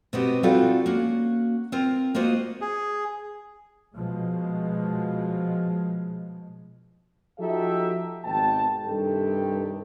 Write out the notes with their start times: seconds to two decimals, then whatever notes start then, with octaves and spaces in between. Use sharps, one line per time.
0.13 B2 B3 C4 F#4 G4 D#5
0.43 G3 C4 D#4 F4 F#4 A4
0.86 A#3 C#4 F#4
1.72 C4 F4 A#4
2.15 A#3 F4 F#4 C5 D#5
2.61 G#4
3.96 B2 F3 G#3
7.38 F3 D#4 F#4 G4 A4 E5
8.23 G#1 B2 G5 A5
8.84 G2 C3 D#3 G4 A4